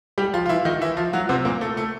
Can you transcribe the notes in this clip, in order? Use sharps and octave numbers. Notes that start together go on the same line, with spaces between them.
G3 G4
F3 F4
F4
E3 E4
D#3 D#4
E3 E4
F3 F4
F#3 F#4
C3 C4
A#2 A#3
A3
A3